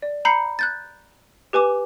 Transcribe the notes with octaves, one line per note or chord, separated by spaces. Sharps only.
D5
A#5 B5 G6 C7 C#7
F#6 G6 A6
G4 B4 G#5 D6